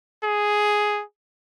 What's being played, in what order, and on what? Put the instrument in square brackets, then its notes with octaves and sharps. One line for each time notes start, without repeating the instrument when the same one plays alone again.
[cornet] G#4